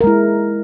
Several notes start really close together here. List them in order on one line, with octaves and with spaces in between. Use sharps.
A#4 G#3 E4